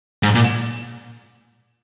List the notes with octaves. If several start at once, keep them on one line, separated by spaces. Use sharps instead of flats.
G#2
A#2